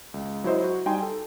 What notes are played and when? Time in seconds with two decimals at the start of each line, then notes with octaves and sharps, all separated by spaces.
0.14 C#2
0.44 F#3 E4 C5 D#5
0.64 F#4
0.86 G3 D#4 G5 G#5 C6
1.03 A4